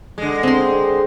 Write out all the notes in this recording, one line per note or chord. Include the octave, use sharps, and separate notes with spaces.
D3 G#3
C4 C6